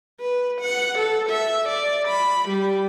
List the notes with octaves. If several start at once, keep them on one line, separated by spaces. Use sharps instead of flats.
B4
F#5
A4
E5
D5
B5
G3